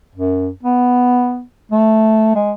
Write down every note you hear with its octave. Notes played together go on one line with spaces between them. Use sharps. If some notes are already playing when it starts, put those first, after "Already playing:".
F#2
B3
A3
G#3